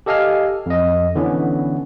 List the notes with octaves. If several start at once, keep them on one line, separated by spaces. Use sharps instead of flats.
G4 A4 D#5 F5 G#5 F6
F2 D#5
D3 E3 B3 C#4